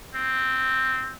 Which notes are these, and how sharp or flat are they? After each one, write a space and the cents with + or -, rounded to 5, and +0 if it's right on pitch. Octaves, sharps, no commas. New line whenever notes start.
C4 +0